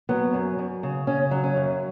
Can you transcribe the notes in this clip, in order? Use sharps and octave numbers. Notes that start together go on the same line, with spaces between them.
F#3 B3
F#2
F#2
C#3
C#3 C#4
F#3
C#4
F#2